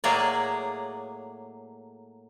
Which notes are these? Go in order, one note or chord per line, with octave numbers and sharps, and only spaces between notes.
A2 F#3 A#3 G#4 D5